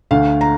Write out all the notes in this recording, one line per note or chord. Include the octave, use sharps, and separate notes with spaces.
D2 D3 A3 F5
A#5